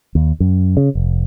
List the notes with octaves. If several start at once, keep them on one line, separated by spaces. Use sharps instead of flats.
D#2
F#2
C#3
F1